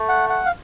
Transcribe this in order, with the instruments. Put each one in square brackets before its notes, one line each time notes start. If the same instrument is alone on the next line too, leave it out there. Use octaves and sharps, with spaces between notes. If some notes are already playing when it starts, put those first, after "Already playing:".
Already playing: [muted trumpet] A3
[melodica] F#5
F#5
F5